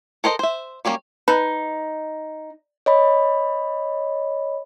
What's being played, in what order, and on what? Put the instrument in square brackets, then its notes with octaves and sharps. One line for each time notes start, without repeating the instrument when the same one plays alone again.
[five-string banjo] A4 A#4 C5 D#5
C5 E5
F#3 G3 A#3 C#4
[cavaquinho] D#4 [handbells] B4 A5 B5
[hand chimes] C#5 D#5 B5